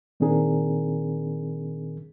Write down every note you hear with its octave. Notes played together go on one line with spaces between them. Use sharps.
A#2 D#3 C4 D4 G#4 A#4